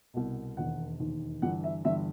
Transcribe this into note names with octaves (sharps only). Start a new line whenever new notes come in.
C2 B2
E1 D#2 D#3 F#5
E1 D#2 D#3
G1 G2 E3 F#5
E5
G1 G2 E3 E5